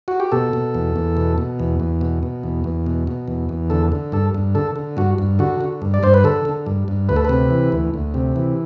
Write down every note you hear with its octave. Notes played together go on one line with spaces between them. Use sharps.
F#4
G4
B2 A4
B2
E2
E2
B2
B2
E2
E2
B2
B2
E2
E2
B2
B2
E2
E2
D3 A4
D3
G2 A4
G2
D3 A4
D3
G2 F#4
G2
D3 F#4
D3
G2
D5
G2 C5
B4
D3 A4
D3
G2
G2
D2 B4
A4
C3 B4
E3
D2
D2
C3
E3